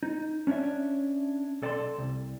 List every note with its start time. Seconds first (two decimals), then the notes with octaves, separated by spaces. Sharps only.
0.03 D#4
0.47 C#4 D4 C#5 D5 E5
1.62 B1 A4 D5 G5 A5 C6
1.98 C2